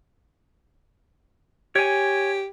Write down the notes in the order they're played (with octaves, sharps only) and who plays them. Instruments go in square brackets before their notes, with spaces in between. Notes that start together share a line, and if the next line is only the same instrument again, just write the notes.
[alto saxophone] G4 [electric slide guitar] C#5 G#5